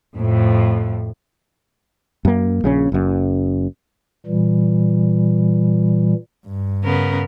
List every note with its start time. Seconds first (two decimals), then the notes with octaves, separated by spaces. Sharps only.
0.15 F2 A2
2.25 F#2 A#3
2.64 A#1 C#3 C#4
2.92 F#1 F#2
4.26 A#2 E3 G3
6.47 G2
6.84 C#3 B3 A#4